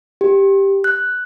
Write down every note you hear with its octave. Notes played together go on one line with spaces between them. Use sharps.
G4
F#6